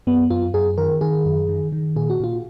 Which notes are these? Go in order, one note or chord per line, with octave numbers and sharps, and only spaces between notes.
F#2 B3
F#2 F4
F#2 G#4
D#3 A#4
D#3 G#4
F#2
D#3
D#3
A#2 G#4
F#4
A#2 F4